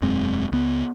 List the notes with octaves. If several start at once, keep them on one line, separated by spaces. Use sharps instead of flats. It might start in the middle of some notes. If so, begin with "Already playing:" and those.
E1 F#2 G#3 C4
C#2 B3